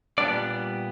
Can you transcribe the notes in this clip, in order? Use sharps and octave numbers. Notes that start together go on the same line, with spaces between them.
A#2 G3 B3 D4 D5